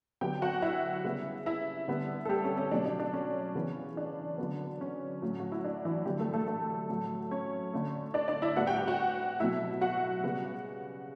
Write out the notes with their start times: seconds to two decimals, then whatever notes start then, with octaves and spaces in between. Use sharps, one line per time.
0.21 D3 F#3 B3 G4 G5
0.42 F#4 F#5
0.62 E4 E5
1.04 C#3 G3 B3
1.46 E4 E5
1.88 D3 G3 B3
2.25 A4
2.29 G3 G4
2.44 C#4
2.58 C#4
2.71 B2 F#3 A3 D4
2.85 D4
3.00 D4
3.13 C#4
3.55 C#3 E3 B3
3.97 D4
4.38 D3 F#3 B3
4.81 C#4
5.22 A2 F#3 A3
5.40 F#4
5.52 E4
5.65 D4
5.85 E3 E4
6.05 D3 F#3 G3 A3 G4
6.19 A3 A4
6.34 A3 A4
6.47 A3 A4
6.89 A2 F#3 A3
7.31 C#4 C#5
7.73 D3 A3
8.14 D4 D5
8.28 D4 D5
8.42 E4 E5
8.56 A2 G3 B3 F#4 F#5
8.67 G4 G5
8.77 G4 G5
8.87 F#4 F#5
9.40 B2 F#3 A3 E4 E5
9.81 F#4 F#5
10.24 C#3 G3 B3